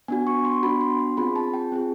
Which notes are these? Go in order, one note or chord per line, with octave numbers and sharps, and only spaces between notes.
B3 D4 F#4 G#5
C#6
C6
B3 D4 F#4 B5
C6
C6
C4 F4 G#4 B5
A5
G5
C4 F4 G#4